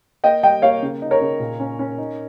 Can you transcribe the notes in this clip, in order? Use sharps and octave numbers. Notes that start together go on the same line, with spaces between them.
A#3 D#5 G5
G3 D#5 G5
A#3 C#5 F5
C#3
D#4
A#4 C#5
C#3
A#2
C#4
C#4
D#4